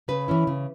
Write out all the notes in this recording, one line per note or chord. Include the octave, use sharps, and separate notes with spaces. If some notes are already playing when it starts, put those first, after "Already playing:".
C#3 B4
E3 C#4 E4
C#3